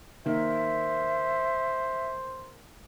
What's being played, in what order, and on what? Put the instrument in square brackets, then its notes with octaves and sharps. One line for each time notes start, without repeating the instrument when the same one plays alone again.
[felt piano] D#3 A#3 [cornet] C5 [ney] E5